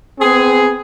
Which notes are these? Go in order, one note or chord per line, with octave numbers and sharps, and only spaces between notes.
B3 C4 G#4